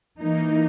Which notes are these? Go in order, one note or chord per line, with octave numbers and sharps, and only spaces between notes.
E3 A#3 D#4